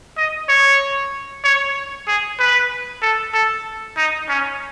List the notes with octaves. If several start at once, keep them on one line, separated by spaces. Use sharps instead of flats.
D#5
C#5
C#5
G#4
B4
A4
A4
D#4
C#4